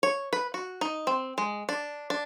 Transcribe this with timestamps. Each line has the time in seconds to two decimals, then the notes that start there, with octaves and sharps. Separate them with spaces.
0.03 C#5
0.33 B4
0.54 F#4
0.81 D#4
1.07 C4
1.38 G#3
1.69 D4
2.10 D4